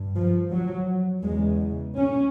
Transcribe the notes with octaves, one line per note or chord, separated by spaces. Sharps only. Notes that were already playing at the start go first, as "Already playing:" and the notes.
Already playing: G2
F3
F#3
E2 C#3 G#3
C#4